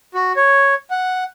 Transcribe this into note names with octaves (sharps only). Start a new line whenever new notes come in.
F#4
C#5
F#5